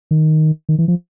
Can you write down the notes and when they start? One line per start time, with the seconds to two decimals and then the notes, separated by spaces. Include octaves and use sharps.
0.11 D#3
0.69 D#3
0.79 E3
0.88 F3